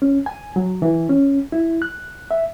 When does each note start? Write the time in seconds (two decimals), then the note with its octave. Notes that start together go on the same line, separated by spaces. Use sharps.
0.02 C#4
0.26 G#5
0.56 F#3
0.82 E3
1.09 C#4
1.52 E4
1.82 F#6
2.31 E5